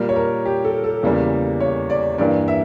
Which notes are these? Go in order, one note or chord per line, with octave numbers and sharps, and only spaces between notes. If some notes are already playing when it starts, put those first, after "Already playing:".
Already playing: A#2 G3 A#3
C#5
A#4
G4
A4
A4
E2 C#3 E3 G3 A#3
C#5
D5
G2 E3 A#3 D5
E5